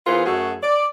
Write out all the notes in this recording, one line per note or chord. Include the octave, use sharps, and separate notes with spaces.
E3 B3 F4 G#4 A#4 C5
F#2 A3 F#4 G#4 A4
D5